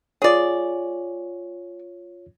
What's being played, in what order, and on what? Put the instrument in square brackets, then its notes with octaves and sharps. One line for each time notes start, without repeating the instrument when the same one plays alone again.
[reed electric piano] F4 C#5 [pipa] G#4 D5